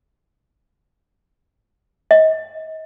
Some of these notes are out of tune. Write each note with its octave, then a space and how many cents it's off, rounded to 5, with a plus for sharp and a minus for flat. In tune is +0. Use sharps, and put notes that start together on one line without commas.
D#5 +30